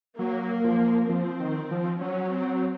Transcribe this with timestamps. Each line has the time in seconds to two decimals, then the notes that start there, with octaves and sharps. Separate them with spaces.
0.18 F#3 A#3
0.64 F3
1.09 F3 C4
1.39 D#3
1.71 F3
2.01 F#3 C#4
2.31 C4